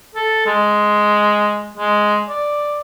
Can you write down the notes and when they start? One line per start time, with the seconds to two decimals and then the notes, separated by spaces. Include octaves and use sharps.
0.15 A4
0.46 G#3
1.77 G#3
2.29 D5